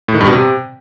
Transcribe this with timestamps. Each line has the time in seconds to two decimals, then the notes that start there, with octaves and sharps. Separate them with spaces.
0.08 A2
0.14 D#3
0.21 G2
0.27 B2
0.33 C3